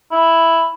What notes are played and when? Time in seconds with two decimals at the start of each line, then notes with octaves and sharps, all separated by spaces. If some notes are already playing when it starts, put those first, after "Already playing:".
0.11 E4